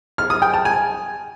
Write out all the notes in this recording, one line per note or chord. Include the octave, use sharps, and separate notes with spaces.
F6
D#6
G5
A5
G#5